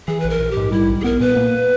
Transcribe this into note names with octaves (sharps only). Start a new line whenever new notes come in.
E3 G#4
A#1 B4
A#4
A#1
G4
G#2
G3 E4
B1
G#4
B3 A#4
A#2 B4
A#3